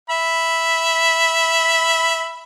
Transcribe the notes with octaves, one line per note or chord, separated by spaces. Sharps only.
E5 B5